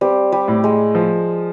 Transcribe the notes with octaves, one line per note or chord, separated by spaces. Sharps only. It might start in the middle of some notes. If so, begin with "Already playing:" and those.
G3 C4
G3
A2
G#3
F3